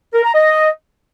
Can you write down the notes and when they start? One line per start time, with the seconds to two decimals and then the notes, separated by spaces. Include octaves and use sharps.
0.14 A#4
0.24 A#5
0.34 D#5